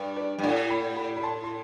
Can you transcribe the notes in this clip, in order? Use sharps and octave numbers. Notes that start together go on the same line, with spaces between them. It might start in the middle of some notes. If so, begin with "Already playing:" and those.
Already playing: G2 B4 D5
B4 D5
G2
A2 D5 F#5
G5 B5
G5 B5
B5
A5 C6
C6